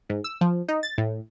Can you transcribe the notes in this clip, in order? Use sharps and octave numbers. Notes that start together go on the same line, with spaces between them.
G#2
E6
F3
D#4
A6
A2